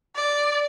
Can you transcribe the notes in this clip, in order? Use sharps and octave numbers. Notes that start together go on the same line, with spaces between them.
D5